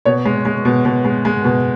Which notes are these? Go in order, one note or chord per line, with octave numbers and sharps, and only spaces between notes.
B2 C#5
G#3
G#3
B2
B2
G#3
G#3
B2